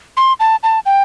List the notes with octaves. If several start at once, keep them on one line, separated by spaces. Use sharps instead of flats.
C6
A5
A5
G5